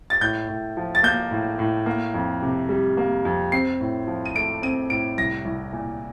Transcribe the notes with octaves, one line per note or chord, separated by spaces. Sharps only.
A6
A2 G6
A2
F3
A6
A#3 G6
A2
A2
A#3
F2
C3
G3
A#3
F2
C4 C7
A2
F3
D#7
A3 D7
C4 D#7
A2 D7
C2 A#6
C2
A#2